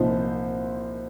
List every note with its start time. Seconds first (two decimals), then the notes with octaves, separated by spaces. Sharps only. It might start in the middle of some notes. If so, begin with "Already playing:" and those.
Already playing: C2 A#2 F3 D#4 C5